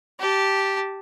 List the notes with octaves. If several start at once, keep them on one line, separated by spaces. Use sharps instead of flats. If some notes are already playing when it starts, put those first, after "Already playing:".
G4 A5